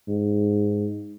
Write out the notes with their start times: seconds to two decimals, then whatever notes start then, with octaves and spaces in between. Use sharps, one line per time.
0.08 G#2